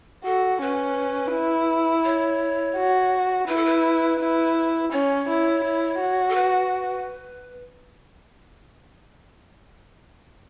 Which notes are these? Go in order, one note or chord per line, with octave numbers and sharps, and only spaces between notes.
F#4 A4
C#4 B4
E4
C#5
F#4
E4 B4
A4
B4
E4
C#4 C#5
E4
E4
F#4
A4
B4